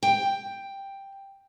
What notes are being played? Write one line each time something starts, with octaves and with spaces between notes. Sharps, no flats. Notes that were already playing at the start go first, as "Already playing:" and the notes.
G5